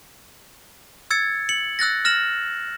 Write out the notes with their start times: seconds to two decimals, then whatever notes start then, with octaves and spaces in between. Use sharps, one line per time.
1.11 E6 G#6 A6 C#7
1.49 C#7 F#7
1.79 E6 F#6 A6 A#6
2.05 F6 A#6 E7 F#7